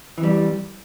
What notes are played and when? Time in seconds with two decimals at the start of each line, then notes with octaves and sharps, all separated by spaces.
0.18 E3
0.20 F2
0.23 G3